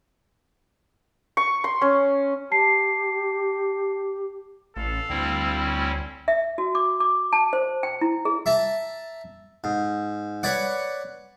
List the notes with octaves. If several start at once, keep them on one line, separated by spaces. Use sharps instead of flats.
C#6
C6
C#4
G4 A5 C7
A1 A4 F5
D2 G3 C4 E4
C#4
E5
F#4
D6
D6
A5
C5
G5
E4
G#4
E5 A5 A#5
G#2
B4 C#5 D5 F#5